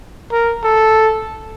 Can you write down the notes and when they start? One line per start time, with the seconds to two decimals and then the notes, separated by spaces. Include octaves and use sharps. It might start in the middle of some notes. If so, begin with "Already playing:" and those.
0.32 A#4
0.64 A4